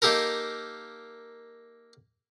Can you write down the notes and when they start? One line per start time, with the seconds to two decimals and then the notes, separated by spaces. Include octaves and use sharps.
0.02 A#3 D#4 G4 A4 A#4